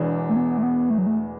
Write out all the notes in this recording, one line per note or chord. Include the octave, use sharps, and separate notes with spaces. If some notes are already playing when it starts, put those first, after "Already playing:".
Already playing: E1 E2 E3 D4
A3
B3
A3
B3
A3
F#3
A3